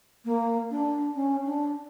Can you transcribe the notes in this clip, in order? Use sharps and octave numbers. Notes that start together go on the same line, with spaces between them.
A#3
D4
C#4
D4